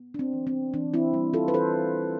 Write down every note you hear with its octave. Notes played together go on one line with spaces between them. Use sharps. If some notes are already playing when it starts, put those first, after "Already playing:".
Already playing: B3
D4
C4
E3
C4
E3 D4
C4 E4
G3
F4 A4
B4
E3 A4 C5